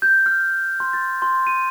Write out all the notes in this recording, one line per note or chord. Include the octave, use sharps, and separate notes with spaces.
G6
F6
C6
A6
C6
D#7